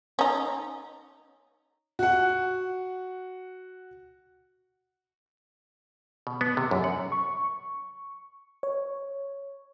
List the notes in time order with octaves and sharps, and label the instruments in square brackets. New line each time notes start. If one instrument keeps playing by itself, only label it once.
[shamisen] C#4 D#4
[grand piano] F#4 F#5
[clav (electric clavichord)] B2
B3
C3
F#2
F#5
[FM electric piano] C#6
C#5